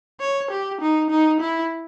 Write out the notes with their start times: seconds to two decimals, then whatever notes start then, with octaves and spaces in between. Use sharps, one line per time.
0.20 C#5
0.51 G4
0.81 D#4
1.10 D#4
1.41 E4